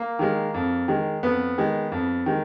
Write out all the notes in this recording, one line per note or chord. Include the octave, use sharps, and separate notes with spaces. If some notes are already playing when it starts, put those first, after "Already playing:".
Already playing: A#3
D#3 G#3
F2
D#3 G#3
F2 B3
D#3 G#3
F2
D#3 G#3